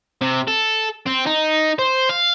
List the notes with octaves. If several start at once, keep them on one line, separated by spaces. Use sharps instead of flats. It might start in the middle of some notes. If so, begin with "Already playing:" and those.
C3
A4
C4
D#4
C5
F5